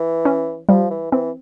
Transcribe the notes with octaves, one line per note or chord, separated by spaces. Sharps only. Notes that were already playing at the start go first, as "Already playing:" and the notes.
Already playing: E3
C#4
F3 G3
E3
E3 C4